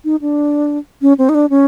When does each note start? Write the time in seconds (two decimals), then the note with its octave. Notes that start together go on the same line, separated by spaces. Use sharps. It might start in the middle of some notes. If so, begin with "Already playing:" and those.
0.05 D#4
0.21 D4
1.02 C#4
1.18 C4
1.29 D#4
1.35 D4
1.50 C#4